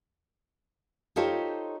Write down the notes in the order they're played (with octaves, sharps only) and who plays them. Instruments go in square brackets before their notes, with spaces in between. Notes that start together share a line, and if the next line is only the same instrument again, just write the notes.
[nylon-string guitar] D#4 F4 G4 A4 C5 C#5